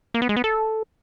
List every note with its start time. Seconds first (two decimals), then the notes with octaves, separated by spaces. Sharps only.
0.14 A#3
0.22 B3
0.29 G#3
0.36 B3
0.44 A4